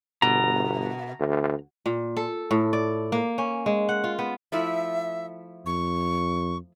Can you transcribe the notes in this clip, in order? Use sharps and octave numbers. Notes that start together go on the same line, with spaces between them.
G1 B2 A#5
D2
A#2
A4
A2
D5
A#3
C#4
G#3
F#5
F4
B3
F3 A3 E4 E5
F2 C#6